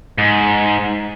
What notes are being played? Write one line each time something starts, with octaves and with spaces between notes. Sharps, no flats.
G#2